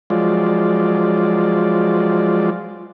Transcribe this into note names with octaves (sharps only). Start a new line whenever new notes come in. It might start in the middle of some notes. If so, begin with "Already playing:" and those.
F3 F#3 G#3 F4 D5